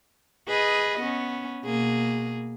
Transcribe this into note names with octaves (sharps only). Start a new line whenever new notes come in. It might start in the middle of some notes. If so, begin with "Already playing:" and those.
G#4 B4 D#5
B3 C#4
B2 A#3 G#4